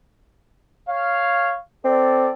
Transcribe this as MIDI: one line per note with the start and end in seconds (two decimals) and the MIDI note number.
0.88 1.56 73
0.88 1.56 77
1.85 2.32 60
1.85 2.29 69
1.85 2.29 74